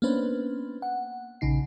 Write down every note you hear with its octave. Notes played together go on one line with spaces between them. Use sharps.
A#3 B3 C#4 D4 B4 C5
F#5
A#1 C#3 D#4 C7